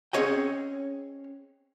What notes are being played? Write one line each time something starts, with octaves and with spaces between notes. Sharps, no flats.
C4 C#4 G#4 C#5 D#5 G5